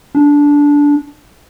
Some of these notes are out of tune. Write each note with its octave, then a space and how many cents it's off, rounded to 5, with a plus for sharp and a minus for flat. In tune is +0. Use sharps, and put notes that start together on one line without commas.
D4 -15